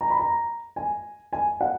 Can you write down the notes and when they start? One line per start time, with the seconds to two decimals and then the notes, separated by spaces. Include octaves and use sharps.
0.01 A#5
0.10 B5
0.20 A#5
0.76 G#5
1.33 G#5
1.61 F#5